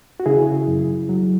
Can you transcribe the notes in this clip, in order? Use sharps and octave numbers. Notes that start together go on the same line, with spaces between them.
F#4
C#3 E4 G#4
F#2
F#3